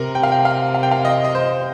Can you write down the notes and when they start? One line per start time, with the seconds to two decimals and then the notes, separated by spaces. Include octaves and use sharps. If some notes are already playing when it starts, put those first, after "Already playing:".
Already playing: C3 A#4
0.15 G5
0.23 F5
0.32 G5
0.45 F5
0.75 F5
0.83 G5
0.91 F5
1.05 D#5
1.24 D#5
1.35 C5